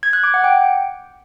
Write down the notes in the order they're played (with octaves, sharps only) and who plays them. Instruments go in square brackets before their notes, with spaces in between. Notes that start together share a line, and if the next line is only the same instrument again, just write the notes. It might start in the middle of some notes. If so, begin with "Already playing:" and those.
[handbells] G#6
F#6
D6
F#5
G5